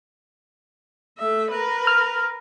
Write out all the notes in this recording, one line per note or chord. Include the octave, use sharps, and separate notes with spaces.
A3 E5
A#4 B4
F6